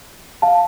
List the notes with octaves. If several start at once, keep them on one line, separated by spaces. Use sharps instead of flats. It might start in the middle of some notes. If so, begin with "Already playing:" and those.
F5 A5